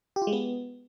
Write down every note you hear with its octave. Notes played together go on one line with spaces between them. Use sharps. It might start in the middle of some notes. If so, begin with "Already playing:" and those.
G4
F4
G#3
B3